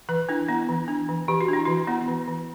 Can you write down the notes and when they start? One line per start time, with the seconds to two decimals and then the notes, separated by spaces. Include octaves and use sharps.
0.09 E3 B4
0.29 D4 E4
0.49 B3 E4
0.69 E3
0.88 D4
1.09 E3
1.28 E3 G4
1.41 F#4
1.48 D4 E4
1.65 E3 F#4
1.87 B3 E4
2.08 E3
2.27 E3